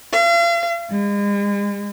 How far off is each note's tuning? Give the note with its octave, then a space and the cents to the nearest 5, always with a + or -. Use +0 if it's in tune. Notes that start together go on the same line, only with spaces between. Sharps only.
F5 -40
G#3 -40